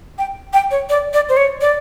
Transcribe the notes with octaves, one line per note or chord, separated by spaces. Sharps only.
G5
G5
C#5
D5
D5
C5
C#5
D5